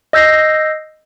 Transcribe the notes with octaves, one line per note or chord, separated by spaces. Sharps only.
D#5 E6 G6 A#6 C7